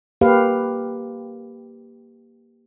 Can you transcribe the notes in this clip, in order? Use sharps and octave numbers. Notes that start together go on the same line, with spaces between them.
A#3 G4 B4 F5